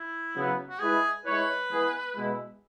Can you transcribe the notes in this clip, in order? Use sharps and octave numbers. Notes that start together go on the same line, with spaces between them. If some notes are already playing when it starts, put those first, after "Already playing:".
Already playing: E4
C#3 F#3 B3
F#4
G#3 E4 G#4 B4
G#3 E4 B4 C#5
E3 G#3 B3 G#4
B2 G#3 E4